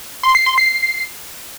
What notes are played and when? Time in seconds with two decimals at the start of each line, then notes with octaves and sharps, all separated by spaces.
0.23 C6
0.35 C7
0.46 C6
0.58 C7